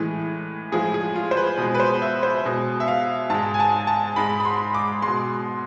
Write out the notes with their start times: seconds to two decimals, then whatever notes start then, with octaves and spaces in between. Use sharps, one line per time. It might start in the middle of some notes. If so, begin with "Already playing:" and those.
Already playing: A2 E3 G#3
0.72 A2 F3 G#3 G#4
0.94 G#4
1.16 F4
1.31 C5
1.37 B4
1.58 B2 G#3
1.74 B4
1.80 C5
2.02 E5
2.23 C5
2.45 B2 G#3
2.80 E5
2.88 F5
3.30 G#2 G#3 A5
3.54 G#5
3.60 A5
3.87 A5
4.16 G#2 G#3 B5
4.40 B5
4.45 C6
4.74 D6
5.02 G#3 C6
5.07 B2